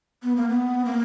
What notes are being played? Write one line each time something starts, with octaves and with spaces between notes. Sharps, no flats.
B3
A#3
B3
A#3